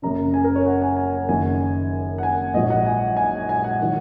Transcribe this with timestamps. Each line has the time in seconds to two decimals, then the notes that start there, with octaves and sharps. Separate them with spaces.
0.02 F#1 F#2 C#3 A#5
0.34 G#5
0.44 A#4
0.56 C#5
0.66 F#5
0.82 G#5
0.97 G#5
1.13 F#5
1.28 F#1 F#2 D#3 G#5
2.18 F#5
2.23 G#5
2.54 A#1 G#2 F#3 D#5
2.70 F#5
2.86 G#5
3.17 G#5
3.49 G#5
3.64 F#5
3.82 D#3 F#3